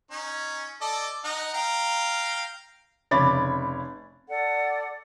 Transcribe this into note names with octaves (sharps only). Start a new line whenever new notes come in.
C#4 D#4
A4 D5 D#5
D#4 D#5 F#5
F5 G5 A#5
F1 C#3 C#5 B5 D6 A6
A4 D5 F#5